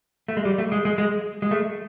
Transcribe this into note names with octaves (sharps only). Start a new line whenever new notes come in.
A3
G#3
G3
A3
G#3
G#3
G#3
G#3
A3